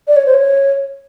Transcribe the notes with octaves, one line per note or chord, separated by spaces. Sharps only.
D5
C#5
C5
C#5